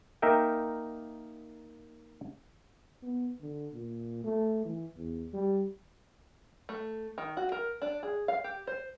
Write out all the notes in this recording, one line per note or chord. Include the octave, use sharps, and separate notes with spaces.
A#3 D#4 A#4 E5 G5
B3
D3
A#2
A3
E3
E2
G3
A3
D#3
F#4
A#4
D4
G#4
F5
G4
C5